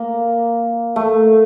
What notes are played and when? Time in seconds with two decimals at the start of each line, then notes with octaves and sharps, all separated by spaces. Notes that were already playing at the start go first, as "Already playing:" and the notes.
Already playing: A#3
0.96 A3